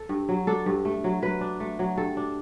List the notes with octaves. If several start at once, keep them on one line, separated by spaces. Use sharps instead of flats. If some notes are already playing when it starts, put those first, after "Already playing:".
Already playing: A4
G2
F#3
D4 A4
G2
A3
F#3
F#3 B4
D4
A3
F#3
G2 A4
D4